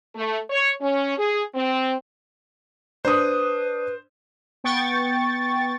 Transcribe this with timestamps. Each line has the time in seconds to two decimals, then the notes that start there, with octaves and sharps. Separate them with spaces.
0.15 A3
0.50 C#5
0.81 C#4
1.18 G#4
1.55 C4
3.05 D4 B4 C5 D#6
4.64 B3 G5 C#6 A6